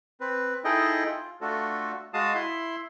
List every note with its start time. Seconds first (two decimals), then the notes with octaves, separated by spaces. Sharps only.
0.20 C4 B4
0.64 D#4 E4 G#4 A4 D#5 G5
1.07 F4
1.41 A3 D4 F4 F#4 A4
2.14 G#3 F#4 F5 A5 D#6
2.35 E4 E5 C6